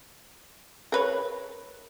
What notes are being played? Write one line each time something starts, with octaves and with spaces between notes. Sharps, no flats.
A#4 B4 C#5